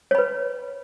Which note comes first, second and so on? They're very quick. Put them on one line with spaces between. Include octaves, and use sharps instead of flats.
C#5 B5 B4